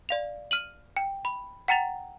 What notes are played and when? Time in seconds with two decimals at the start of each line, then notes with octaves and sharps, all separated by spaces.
0.09 D5 F5 F7
0.51 F6 D#7 F#7
0.97 G5
1.25 B5
1.68 F#5 G5 A#5 A6 F7